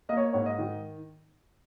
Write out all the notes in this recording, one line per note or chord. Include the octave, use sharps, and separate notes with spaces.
A#3 D#5
C#5
G#2 C#5
D#5
D#3